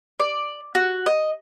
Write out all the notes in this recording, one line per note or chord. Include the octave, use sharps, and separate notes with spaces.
D5
F#4
D#5